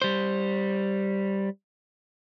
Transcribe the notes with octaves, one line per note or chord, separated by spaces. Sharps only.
G3 C5